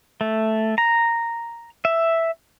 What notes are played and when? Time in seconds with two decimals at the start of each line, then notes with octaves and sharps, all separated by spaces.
0.21 A3
0.78 A#5
1.85 E5